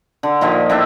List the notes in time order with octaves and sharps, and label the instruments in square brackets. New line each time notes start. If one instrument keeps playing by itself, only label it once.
[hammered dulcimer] D3
A#2 D#3 F3 F5
A2 D4 E5